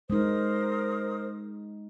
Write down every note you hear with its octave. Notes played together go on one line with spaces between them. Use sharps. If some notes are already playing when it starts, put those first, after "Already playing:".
G#3 D#4 A#4 C5 D#6